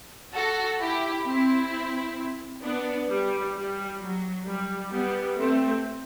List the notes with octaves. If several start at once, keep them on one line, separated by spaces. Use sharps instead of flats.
F#4 A4
E4 G4
C4 E4
B3 D4
G3
G3
F#3
G3
G3 B3
A3 C4